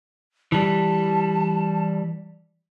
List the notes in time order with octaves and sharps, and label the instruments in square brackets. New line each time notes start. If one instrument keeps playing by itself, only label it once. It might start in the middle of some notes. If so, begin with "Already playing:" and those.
[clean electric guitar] E3 G3 [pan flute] A5